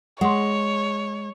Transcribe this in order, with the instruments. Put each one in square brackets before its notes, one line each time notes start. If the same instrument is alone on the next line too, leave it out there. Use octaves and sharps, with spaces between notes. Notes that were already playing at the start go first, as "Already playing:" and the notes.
[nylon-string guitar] G#3 [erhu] C#5 [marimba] F#5 C6